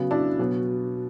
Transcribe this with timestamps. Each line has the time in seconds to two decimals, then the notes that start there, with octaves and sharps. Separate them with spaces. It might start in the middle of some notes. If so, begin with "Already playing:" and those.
Already playing: C#3 F#3 B3
0.11 D4 E4
0.39 B2 F#3 B3